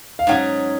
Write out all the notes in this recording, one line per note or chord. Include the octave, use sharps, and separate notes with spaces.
F5
G#2 F#3 C#4 G#4 F#5